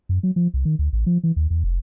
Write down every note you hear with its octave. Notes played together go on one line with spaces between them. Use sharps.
F#2
F#3
F3
C2
D#3
D2
A1
F3
E3
D#2
E2
F1